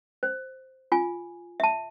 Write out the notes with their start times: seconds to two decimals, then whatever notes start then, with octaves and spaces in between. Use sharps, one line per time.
0.23 C5
0.92 F4 G#5
1.60 E5 A5